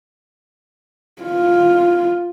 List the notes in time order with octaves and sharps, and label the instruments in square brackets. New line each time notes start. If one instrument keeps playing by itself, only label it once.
[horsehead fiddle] F4